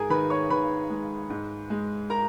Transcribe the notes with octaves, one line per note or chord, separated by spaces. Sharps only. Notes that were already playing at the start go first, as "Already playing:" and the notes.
Already playing: G#2 G#4 A#4 G#5
D#3 B4 B5
C#5 C#6
D#3 B4 B5
G#3
G#2
G#3
A#4 A#5